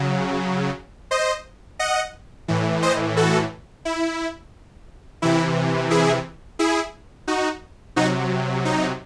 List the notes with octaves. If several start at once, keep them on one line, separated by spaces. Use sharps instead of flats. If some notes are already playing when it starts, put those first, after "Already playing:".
Already playing: C#3 F#3
C5 D#5
D#5 F#5
A2 E3
C5 D#5
F#4 A4
E4
C3 E3 E4
E4 G#4
E4 G#4
D#4 F#4
C3 F#3 D#4 F#4
D#4